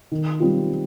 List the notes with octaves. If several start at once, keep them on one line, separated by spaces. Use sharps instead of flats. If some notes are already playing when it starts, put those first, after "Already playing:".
D#3
G3 C4 F4